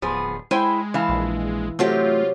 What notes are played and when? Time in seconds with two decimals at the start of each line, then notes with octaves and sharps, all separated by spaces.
0.02 D1 F3 B3 G#4
0.51 G#3 E4 C5 G5 G#5
0.94 E3 F5 A5
1.09 A#1
1.79 C3 F#3 A3 F4 G4